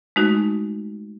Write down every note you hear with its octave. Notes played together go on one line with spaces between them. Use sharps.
G#3 A3 D#4 F#4